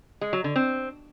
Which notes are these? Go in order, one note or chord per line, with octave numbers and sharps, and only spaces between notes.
G#3
F#3
D3
C4